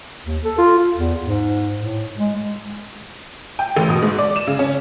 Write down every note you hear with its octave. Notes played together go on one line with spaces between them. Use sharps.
D#2
A4
F4
F4
E2
G#2
A2
G#3
G5
A1
B2
G#2
D5
E7
C#3
C#4